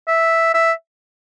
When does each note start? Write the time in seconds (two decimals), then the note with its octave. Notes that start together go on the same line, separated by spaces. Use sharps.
0.08 E5
0.54 E5